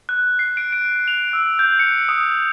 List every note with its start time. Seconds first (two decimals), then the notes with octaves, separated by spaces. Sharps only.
0.09 F#6
0.39 C7
0.57 D7
0.72 D7
1.08 F7
1.33 E6
1.59 G6
1.79 C#7
2.09 D#6